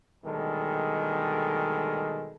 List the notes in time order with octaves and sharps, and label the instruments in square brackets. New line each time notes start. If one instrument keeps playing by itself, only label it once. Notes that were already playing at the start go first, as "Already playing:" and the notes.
[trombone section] D2 B2 D#3 G3 G#3 A4